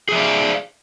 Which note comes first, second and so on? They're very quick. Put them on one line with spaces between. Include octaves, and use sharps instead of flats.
G#4 E5 D5 F5